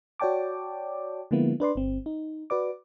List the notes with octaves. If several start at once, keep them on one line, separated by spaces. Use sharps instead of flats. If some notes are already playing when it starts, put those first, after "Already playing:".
F#4 C#5 D5 G5 A5 D6
D3 F3 G#3 A#3 B3 E4
D4 B4 D5 C6
G1 C4
D#4
F#4 B4 D5 D6